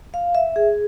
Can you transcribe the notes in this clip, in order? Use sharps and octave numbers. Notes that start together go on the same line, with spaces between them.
F5
E5
G#4